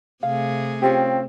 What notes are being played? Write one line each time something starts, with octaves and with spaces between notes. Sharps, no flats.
C3 A3 G#4 F5
C4 C#4 F4 G4